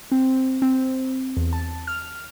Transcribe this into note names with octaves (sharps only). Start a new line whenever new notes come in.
C4
C4
E2
A5
F6